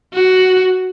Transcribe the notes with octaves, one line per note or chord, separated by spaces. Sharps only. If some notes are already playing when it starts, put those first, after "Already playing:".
F#4